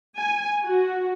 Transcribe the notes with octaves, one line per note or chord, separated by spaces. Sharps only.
G#5
F#4